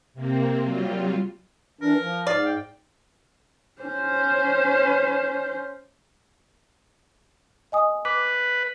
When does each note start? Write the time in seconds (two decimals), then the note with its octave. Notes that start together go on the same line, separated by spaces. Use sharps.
0.14 C3 A#3 C4
0.63 F#3 G3 F4
1.81 E3 D4 A#4
2.00 F3
2.27 G#2 D5 F5
2.45 G5
3.82 C#4 C5
7.72 D#5 G#5 D#6
8.05 B4 D6